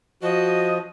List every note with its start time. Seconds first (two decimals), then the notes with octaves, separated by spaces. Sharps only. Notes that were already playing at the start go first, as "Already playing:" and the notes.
0.22 F3 F#4 D#5